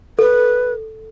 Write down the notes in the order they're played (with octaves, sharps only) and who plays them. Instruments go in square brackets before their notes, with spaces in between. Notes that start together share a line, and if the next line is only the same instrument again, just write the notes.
[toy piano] A4 [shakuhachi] B4